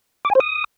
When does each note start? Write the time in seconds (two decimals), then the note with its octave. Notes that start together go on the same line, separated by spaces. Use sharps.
0.25 D6
0.30 G#5
0.35 C5
0.40 D#6